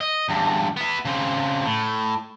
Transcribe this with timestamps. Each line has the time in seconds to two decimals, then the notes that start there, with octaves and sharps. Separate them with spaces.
0.01 D#5
0.29 E2 G2
0.77 B3 E4
1.05 C#3 C4
1.65 A2